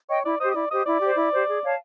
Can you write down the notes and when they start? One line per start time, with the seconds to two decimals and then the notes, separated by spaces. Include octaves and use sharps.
0.09 C#5 D#5 G5
0.24 E4 D5
0.40 C5 D#5
0.43 G4
0.51 D#5
0.55 E4 D5
0.71 G4 C5 D#5
0.86 E4 D5
1.01 G4 C5
1.17 E4
1.33 G4 C5
1.49 G#4
1.64 C#5 F5 A5